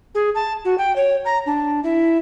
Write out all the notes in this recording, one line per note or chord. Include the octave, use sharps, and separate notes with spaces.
G#4
A5
F#4
G5
C#5
A#5
D4
E4